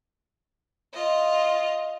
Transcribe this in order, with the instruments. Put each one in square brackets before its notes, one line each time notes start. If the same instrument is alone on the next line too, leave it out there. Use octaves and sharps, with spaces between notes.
[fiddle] F4 D#5